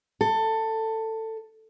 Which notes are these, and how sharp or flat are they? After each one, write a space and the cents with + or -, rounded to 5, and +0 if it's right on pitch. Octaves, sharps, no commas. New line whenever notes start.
A4 +15